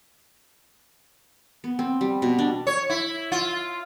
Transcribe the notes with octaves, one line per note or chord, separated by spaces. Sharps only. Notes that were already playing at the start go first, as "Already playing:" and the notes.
B3
C4
G3
B2
D4
C#5
E4
F4